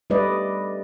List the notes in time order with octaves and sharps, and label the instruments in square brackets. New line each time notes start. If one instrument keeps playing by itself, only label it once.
[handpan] G3 A3 B4 D5 D#5